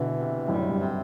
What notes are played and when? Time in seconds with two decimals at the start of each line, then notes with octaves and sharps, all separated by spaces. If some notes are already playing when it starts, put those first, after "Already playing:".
Already playing: B2 D3 E3
0.17 C3
0.48 F#2 A2 G3
0.69 G2
0.79 C3